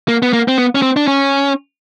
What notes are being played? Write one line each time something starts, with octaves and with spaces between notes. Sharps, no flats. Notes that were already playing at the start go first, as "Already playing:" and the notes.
A#3
B3
A#3
C4
B3
C#4
C4
D4
C#4